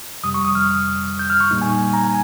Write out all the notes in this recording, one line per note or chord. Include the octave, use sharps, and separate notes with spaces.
F2 C3 G3 D#6
C#6
D#6
F6
G6
F6
C#6
A#2 G3 A#3 D#4
G#5
G#5
A#5
G#5